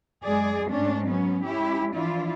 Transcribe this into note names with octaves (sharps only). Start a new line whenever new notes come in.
F#2 G#3 G#4 D5
G#2 A3 C#4 D4
F#3 B3 C#4
G#3 C#4 E4 G4
E3 F3 D4 E4 F4